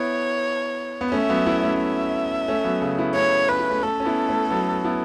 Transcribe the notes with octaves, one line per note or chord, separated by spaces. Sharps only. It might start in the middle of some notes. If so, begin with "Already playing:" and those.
Already playing: B3 E4 C#5
B3
A3 C#4 E5
F#3 B3
B3 E4
A3 C#4
E5
A3 C#4
F#3 B3
C#3
B3 E4
A3 C#4 C#5
C#4 B4
E4
A3 C#4
A3 C#4 A4
C#4
B3 E4
A3 C#4
F#3 B3
B3 E4